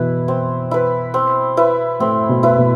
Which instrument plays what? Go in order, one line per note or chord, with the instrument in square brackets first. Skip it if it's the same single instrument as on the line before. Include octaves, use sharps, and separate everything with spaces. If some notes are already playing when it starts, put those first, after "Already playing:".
Already playing: [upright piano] B2 E3 [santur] E4 B4
[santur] C4
E4 B4
C4
E4 B4
[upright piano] A2 [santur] C4
[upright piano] B2
[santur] E4 B4
[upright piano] B2